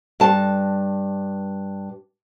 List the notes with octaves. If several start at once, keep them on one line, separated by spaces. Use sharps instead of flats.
G2 A5